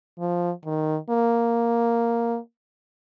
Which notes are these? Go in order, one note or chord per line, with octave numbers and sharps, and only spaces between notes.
F3
D#3
A#3